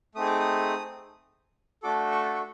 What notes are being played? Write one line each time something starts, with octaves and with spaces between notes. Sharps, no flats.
A3 C4 D#4 G#4 D#6
D6
D#6
A3 D4 F#4 A4 D6
C#6
C#6